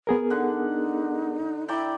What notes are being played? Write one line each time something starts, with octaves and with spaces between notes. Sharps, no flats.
B3 G#4 A#4
D3 D#4 F#5
E4 D5 G5 A#5